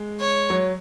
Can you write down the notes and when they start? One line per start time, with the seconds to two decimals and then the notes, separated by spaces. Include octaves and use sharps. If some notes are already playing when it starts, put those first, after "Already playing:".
Already playing: G#3
0.20 C#5
0.50 F#3